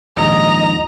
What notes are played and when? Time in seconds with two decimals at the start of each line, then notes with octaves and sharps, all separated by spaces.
0.17 D#1 A#1 G#2 D#5 A#5